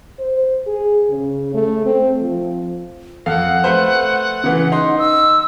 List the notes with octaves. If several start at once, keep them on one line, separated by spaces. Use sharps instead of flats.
C5
G#4
C#3
A3
C4
F3
F2 A4 F5 F#5
A3 B4 C5
C#3 E3
D#4 C6
E6